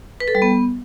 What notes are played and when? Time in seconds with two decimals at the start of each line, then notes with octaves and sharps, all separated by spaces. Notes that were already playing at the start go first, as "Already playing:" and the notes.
0.20 B4
0.28 A4
0.35 G3
0.42 B3